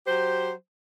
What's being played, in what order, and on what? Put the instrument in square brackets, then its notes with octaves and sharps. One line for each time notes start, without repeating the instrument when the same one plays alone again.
[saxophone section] F#3 G4 C5